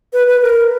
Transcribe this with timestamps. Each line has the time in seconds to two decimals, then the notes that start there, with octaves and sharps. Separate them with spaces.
0.13 B4
0.27 B4
0.42 A#4